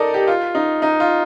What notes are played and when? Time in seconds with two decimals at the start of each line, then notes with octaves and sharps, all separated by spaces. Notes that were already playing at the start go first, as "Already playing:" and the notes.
Already playing: D#4 A4 A#4 D5 D#5
0.14 G4
0.27 F4
0.55 D#4
0.82 D#4
1.00 F4